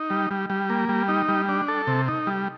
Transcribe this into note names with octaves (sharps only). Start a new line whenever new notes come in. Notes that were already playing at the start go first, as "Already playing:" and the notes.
Already playing: D#4
G3
G3
G3
A#3
G3
D#4
G3
D4
A4
C3
D#4
G3